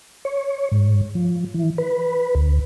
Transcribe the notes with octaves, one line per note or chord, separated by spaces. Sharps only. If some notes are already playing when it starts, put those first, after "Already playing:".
C#5
G#2
F3
E3
B4
D2